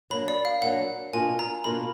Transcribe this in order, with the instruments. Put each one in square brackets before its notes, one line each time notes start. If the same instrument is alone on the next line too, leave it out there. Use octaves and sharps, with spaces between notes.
[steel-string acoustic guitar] F#3 A#3 D4 [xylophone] B5
[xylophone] D5
F5
[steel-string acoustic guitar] F#3 A#3 D4 [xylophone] F#5
[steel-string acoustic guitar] B2 A#3 D4 F4 [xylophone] G#5
[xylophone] A#5
[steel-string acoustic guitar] B2 A#3 D4 F4 [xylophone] B5